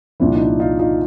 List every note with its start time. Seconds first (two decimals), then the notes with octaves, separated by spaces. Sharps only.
0.20 C2 A#2 F3 D4 E4
0.36 D#4
0.40 D4 E4
0.60 D#4 F4
0.79 D#4 F4